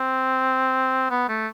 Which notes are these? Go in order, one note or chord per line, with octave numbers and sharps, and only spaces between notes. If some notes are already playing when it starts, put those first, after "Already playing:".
Already playing: C4
B3
A3